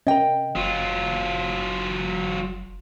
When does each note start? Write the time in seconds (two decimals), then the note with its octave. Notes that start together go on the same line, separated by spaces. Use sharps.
0.07 C3 C#4 A#4 D#5 G5
0.56 F#1 F#3 F4